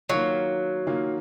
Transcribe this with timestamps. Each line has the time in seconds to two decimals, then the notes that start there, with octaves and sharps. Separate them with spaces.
0.09 D#3 F#3 A#3 F4
0.87 D#3 A#3 F4